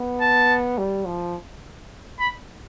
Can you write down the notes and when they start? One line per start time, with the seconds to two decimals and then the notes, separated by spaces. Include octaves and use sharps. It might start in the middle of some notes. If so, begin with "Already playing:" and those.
Already playing: B3
0.21 A5
0.78 G3
1.06 F3
2.20 B5